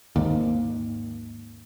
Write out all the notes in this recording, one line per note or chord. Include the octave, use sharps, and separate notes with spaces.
G#1 D#2